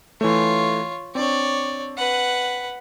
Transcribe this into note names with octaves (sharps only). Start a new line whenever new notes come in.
E3 A3 F4 C#5
C4 D4 C#5 D5
B4 F#5